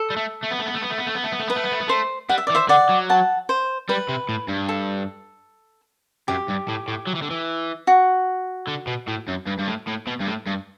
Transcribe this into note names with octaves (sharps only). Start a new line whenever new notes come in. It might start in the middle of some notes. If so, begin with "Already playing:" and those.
Already playing: A4
G3
A3
A3
B3
A3
B3
A3
B3
A3
B3
A3
B3
A3
B3
A3
B3 B4
A3
B3
A3
B3
A3 C5
G3 F#5
E5
E3 D5
C5 E5
D3 D5 F#5
F#3
F#5 A5
C5
G3 B4
C3
A2
G2
A4
F#2 G4
G2
A2
A2
F#3
E3
D3
E3
F#4
D3
B2
A2
F#2
G2
G2
A2
A2
B2
G2
A2
G2